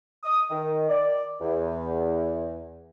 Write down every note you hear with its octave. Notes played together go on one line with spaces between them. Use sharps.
D#6
D#3
D5
E2